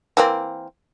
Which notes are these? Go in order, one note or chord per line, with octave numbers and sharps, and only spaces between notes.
E3 A#3 C4